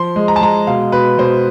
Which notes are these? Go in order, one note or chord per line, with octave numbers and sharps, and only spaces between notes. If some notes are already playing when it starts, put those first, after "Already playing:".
Already playing: F3 C6
G#3
A#5
A5
G#3 A#5
B2 F5
B2 B4
B2 C5